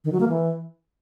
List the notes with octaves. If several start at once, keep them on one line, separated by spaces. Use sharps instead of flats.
D#3
F#3
A#3
E3